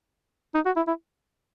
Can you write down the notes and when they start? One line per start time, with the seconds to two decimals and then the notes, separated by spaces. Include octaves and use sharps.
0.54 D#4
0.66 F#4
0.76 E4
0.87 E4